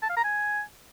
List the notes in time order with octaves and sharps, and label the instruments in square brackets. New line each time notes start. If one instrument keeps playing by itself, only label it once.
[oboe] A5
F5
A#5
G#5